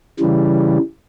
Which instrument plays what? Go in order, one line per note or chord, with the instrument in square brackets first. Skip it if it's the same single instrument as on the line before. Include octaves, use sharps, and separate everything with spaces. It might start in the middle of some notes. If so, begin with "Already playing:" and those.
[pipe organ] C#3 E3 G3